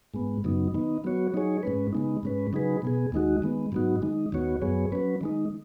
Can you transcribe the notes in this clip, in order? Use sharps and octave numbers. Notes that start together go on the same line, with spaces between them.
G#2 G#3 B3
F#2 C#3 F#3 B3 D#4
D#3 B3 D#4
F#3 B3 F#4 C#5
F#3 D#4 G#4 C#5
G#2 G#3 C#4 B4
C#3 G#3 B3 D#4
G#2 G#3 C#4 B4
C#3 F#3 D#4 G#4 B4
B2 B3 G#4
D#2 D#3 G#3 D#4 F#4
D#3 G#3 B3
G#2 F#3 B3 D#4 F#4
D#3 G#3 D#4
D#2 D#3 B3 F#4 C#5
F#2 F#3 B3 G#4 C#5
F#3 C#4 B4
D#3 G#3 D#4